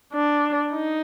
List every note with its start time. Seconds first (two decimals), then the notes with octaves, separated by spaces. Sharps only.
0.13 D4
0.72 D#4